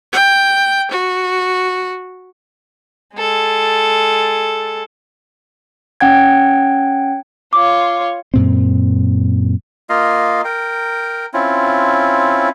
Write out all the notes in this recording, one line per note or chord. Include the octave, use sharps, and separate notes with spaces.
G5
F#4
G#3 A4
C#4 F#5 G5 G#6
F4 C#5 D6
F#2 A#2 C4
A#3 F4 D#5 F5
A#4 G5
C4 C#4 E4 F4